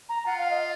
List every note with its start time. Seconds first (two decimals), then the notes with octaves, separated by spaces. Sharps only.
0.09 A#5
0.26 F4 F#5
0.38 F5
0.50 D#5